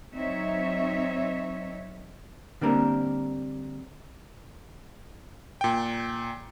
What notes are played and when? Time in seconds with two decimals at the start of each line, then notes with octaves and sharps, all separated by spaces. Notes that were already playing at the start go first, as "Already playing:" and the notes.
0.14 F#3 C4 D#4 C#5 E5
2.61 D3 G3 A#3 C4 D4 A#4
5.61 A#2 G5